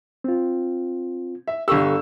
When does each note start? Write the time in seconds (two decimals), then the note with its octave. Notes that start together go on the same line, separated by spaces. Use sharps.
0.24 C4 F4
1.48 E5
1.68 G1 G4 A4 C#6 E6